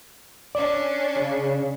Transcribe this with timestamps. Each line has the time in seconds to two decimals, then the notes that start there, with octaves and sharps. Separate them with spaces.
0.55 C#4 D4 D5
1.16 C#3